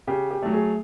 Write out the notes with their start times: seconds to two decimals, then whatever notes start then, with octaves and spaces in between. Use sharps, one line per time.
0.07 C#3 G4
0.31 G4
0.42 F#3 A3
0.53 G#4